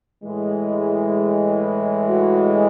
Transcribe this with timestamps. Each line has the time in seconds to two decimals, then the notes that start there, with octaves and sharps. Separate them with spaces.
0.24 A2 E3 G#3
2.06 F#4